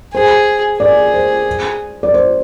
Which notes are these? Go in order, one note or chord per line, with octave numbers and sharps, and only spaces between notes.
G#4 C5
G#4 D5
C5
D5
C5